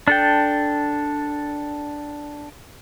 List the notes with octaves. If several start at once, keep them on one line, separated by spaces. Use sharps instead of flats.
D4 A4 G5